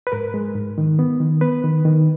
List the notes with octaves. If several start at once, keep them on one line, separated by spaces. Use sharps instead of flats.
B4
G#2 A#4
G#3
G#2
D#3
B3
D#3
B3 B4
D#3
D#3